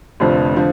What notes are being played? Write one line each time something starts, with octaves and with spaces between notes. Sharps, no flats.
F1 F2 D3 F3
D3 F3